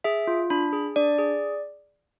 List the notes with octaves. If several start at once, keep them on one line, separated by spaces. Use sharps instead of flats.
G#4 E5
F4
D4 B5
G#4
D4 D5
G#4